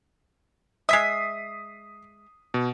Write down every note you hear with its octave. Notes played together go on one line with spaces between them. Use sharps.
G#3 E5 D#6 B6 C7
B2